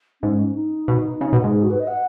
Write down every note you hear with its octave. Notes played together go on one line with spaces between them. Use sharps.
G#2 C#4
D#4
B2
C#3
B2
G#2
G#4
F#4
B4
D#5
F#5